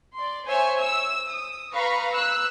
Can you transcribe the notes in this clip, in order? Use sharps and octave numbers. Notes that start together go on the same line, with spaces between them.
D5 C6
C5 C#5 E5 G#5
E6
D#6
B4 F5 A#5 B5 C#6
E6 F#6